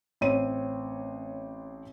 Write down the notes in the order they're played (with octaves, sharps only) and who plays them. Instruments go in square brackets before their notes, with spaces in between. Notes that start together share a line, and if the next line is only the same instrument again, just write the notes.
[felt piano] A1 C4 C#5 C6 D#7